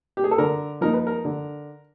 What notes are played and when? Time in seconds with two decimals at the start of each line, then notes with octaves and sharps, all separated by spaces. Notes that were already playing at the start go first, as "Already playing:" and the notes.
0.17 G4
0.24 G#4
0.31 A4
0.38 D3 A#4
0.81 F3 A#3 D#4 A#4
0.94 B4
1.07 A#4
1.25 D3